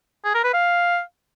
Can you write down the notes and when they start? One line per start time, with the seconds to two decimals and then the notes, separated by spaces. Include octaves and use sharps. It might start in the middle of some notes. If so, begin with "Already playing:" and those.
0.25 G#4
0.34 A#4
0.44 B4
0.54 F5